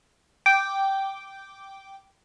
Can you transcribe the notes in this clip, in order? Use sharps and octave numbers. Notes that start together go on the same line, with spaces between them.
G5 D6